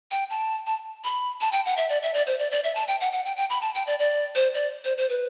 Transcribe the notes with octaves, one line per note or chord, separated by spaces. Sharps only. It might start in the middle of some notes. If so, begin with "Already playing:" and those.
G5
A5
A5
B5
A5
G5
F#5
E5
D5
E5
D5
C5
D5
D5
E5
A5
G5
F#5
F#5
G5
G5
B5
A5
G5
D5
D5
C5
D5
C5
C5
B4